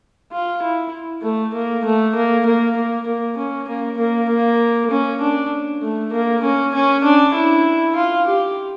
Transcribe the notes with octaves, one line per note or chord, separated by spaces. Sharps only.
F4
E4
A3
A#3
A3
A#3
A#3
A#3
A#3
C#4
A#3
A#3
A#3
C#4
D4
A3
A#3
C#4
C#4
D4
E4
F4
G4